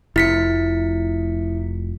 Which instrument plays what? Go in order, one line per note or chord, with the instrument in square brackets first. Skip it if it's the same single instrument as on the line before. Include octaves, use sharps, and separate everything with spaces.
[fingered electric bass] F1 [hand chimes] E4 B6 C#7